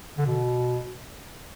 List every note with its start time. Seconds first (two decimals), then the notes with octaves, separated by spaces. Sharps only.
0.18 D3
0.27 B2